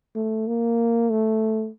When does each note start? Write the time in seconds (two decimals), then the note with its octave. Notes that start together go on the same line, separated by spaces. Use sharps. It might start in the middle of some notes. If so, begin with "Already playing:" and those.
0.15 A3
0.47 A#3
1.10 A3